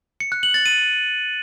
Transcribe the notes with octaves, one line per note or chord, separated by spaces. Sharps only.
C#7
F#6
F#7
A6
D#7